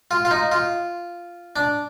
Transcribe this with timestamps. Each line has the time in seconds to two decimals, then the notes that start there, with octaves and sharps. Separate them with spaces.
0.11 F4
0.25 F4
0.31 D#4
0.52 F4
1.56 D4